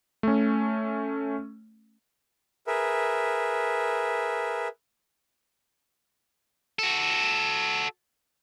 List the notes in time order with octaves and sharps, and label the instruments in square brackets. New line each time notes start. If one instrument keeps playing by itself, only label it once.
[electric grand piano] A3 C#4
[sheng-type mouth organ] G#4 A#4 B4 E5
[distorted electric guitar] F#4 A4